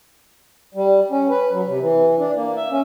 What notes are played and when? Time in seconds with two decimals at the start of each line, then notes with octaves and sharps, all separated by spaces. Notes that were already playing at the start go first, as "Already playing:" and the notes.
0.74 G3
1.11 C#4
1.30 B4
1.51 F#3
1.66 C3
1.81 E3
2.19 D4
2.36 A#3
2.56 E5
2.70 C#4